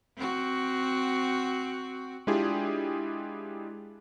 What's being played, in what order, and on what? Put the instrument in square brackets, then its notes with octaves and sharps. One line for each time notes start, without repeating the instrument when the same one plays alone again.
[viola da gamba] C4 F#4
[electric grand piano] G#3 D4 E4 F4 G4 G#4